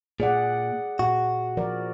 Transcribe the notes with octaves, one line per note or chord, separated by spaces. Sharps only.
A#2 G#4 D5 F#5
A#2 F#4
F3 A#4 D5